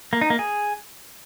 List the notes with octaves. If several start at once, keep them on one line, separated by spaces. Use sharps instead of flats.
A#3
D#4
A#3
G#4